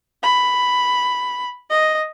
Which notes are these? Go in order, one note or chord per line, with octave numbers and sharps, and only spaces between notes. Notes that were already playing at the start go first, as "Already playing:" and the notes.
B5
D#5